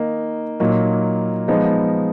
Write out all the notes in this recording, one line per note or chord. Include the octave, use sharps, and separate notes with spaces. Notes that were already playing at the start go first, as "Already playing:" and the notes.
Already playing: D#3 A#3 D#4
A#2 F#3 A#3 D#4
F3 G#3 B3 D#4